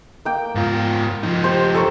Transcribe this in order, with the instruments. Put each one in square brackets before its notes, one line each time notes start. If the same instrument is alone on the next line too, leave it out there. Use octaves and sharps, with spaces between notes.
[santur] A#3 G5
[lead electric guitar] G#2 F4
F3 D#4
[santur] G4 C5
A4 A#4 C#5